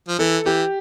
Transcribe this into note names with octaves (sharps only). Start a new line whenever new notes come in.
F3
E3 A4
E3 G4